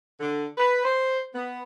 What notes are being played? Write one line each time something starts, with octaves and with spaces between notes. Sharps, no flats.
D3
B4
C5
B3